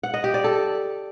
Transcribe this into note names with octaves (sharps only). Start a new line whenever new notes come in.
F#5
D#5
G4
D5
A4